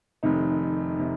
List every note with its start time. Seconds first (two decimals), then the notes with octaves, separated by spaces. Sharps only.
0.23 F1 F2 C3 D#3 D#4
0.99 C3 D#3